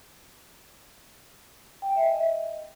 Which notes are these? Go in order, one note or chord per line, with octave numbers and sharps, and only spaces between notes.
G5
G#5
E5
D#5